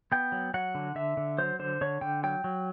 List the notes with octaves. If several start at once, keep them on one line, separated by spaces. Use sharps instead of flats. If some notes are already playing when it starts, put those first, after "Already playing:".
B3 G5
F#3
F#3 F#5
D3
D3 E5
D3
F#3 C5
D3 C5
D3 C#5
D3 G5
F#3 G5
F#3